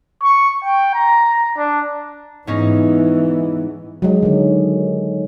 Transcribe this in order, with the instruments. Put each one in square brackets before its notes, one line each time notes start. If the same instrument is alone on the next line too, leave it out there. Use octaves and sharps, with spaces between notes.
[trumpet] C#6
G5
A#5
D4
[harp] G#2 C#4 D#4 [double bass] E3 B3
[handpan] F#3 G#3
D3 D#3